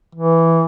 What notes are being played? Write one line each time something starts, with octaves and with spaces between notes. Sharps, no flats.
E3